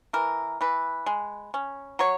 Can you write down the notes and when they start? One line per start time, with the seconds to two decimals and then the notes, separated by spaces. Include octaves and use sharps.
0.13 E3 A#4
0.61 E3 B4
1.06 G#3
1.54 C#4
1.99 F#3 C#5